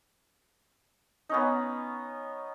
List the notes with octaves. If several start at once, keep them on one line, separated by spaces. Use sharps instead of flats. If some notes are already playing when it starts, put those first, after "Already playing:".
B3 C#4 D#4